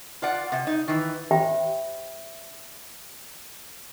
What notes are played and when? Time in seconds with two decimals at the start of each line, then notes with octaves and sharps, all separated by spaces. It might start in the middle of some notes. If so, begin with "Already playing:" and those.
0.22 F4 D5 F#5
0.52 C3
0.67 D#4
0.88 D#3 E3
1.31 G4 C5 E5 G5 B5